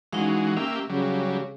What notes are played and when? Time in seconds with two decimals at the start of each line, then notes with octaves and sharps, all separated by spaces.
0.13 E3 G#3 C#4 D#4 F#4 F5
0.57 A#3 C#4 G4 E5
0.89 C#3 F#3 G3